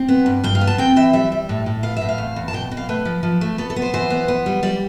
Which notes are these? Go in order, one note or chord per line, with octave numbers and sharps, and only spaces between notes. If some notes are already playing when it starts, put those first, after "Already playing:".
Already playing: C4
B3
G2
G2 G5
F5
B3
A5
C4 G5
E3 E5
G3 E5
G3
A2
A2
B3 F5
A2 E5
F5
E2
E2
A5
B2 G5
B2
F5
A3 B4
F3
F3
A3
B3 A4
A4
B3
C5
E3 C5
B3
B3
G3
G3 D5